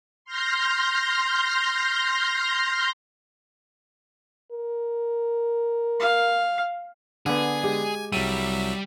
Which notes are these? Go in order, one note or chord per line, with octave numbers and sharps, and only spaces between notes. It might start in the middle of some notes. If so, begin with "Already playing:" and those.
C6 F6 G6 A#6
A#4
F5
D3 B3 G#4 G#5
G#3 G4
C2 F#3 G3 E5 D#7